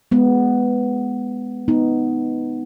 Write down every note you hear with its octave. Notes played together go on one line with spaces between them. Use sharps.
G#3 B3
B3 D#4